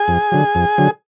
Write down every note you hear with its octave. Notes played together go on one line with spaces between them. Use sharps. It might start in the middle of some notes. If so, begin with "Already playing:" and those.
Already playing: G#4 G#5
F2
D3 F#3
F2
D3 F#3